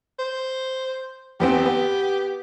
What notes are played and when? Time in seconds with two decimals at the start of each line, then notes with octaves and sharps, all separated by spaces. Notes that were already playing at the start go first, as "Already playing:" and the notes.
0.19 C5
1.40 E2 B3 C4 G4
1.65 B3